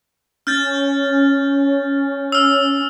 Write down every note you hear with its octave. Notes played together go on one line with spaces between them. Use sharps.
C#4 F6 G6 A6
E6 F6